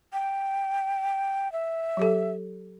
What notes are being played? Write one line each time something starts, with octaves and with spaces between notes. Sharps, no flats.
G5
E5
F#3 G4 A4